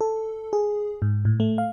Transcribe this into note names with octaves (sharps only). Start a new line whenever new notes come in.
A4
G#4
G#2
A2
A3
F5